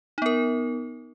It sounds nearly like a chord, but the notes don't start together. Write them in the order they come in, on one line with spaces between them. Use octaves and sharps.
D#4 B3 A#4